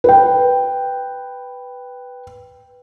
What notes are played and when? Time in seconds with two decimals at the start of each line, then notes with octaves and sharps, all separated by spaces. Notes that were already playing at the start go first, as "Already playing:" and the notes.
0.04 B4 G5